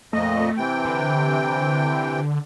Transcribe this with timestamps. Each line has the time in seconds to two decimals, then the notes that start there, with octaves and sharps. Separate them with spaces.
0.13 F2 A#2 A3 D#5
0.57 C3 E3 G5
0.85 D3